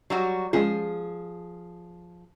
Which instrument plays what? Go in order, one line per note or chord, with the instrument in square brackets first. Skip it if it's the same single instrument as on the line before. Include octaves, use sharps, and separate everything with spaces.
[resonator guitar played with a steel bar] F#3 G3 F#4
[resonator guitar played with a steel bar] F3 G#4 [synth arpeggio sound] G#3 C#4 F4